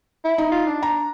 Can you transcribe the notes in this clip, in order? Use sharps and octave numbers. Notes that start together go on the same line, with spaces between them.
E4
D#4
F4
D4
A#5